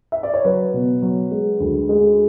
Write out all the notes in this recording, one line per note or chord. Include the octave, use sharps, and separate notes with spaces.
E5
D5
C#5
F#3 B4
B2
F#3
G#3
D2
G#3